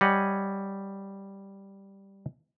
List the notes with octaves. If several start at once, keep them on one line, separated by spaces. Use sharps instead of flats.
G3 C#5 D#5 F#5 G#5